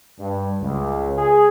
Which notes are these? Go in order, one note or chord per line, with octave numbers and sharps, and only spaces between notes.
G2
C#2
G#4